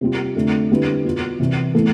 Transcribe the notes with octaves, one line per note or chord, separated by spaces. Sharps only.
C3 G3 C4 F4
F2 D3 A3
D3 G3 C4 E4 B4
B2 B3 F4
C2 C3 E3
A2 E3 B3 E4 A4